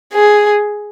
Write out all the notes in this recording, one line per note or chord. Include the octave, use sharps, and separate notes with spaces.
G#4